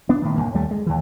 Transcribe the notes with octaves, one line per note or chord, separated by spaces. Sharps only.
B3 D4
A2 D#3
B1 F#2 A#3
D#2 G3 A3
G#3
D#2 E3